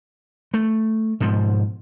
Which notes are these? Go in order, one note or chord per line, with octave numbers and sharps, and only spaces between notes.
A3
G#2 B2 F3